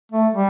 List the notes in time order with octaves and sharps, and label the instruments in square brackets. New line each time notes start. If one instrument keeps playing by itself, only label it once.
[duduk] A3
G3